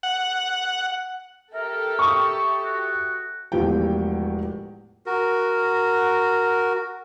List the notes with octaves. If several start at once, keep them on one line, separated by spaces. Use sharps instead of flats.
F#5
G4 A4 A#4 E5
C#6 D#6
F#4
E1 E2 A2 F3 G4 G5
F#4 A#4